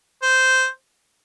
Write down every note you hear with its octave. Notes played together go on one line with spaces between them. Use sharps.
C5